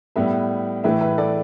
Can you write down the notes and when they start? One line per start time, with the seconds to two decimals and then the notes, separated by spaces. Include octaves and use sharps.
0.16 A2 G3 B3 B4 E5
0.84 A2 E3 A3 B4 E5
1.01 B4 E5
1.18 A4 D5